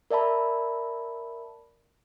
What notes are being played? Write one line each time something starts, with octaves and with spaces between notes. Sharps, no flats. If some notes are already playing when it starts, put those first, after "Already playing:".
A#4 D5 E5 A5 B5